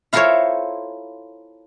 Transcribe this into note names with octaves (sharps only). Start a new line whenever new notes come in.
E4 F4 A4 A#4 C5 C#5